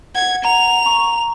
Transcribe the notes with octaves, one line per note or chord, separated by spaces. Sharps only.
F#5 G#6
F#5 A#5 F7
A#5 C#6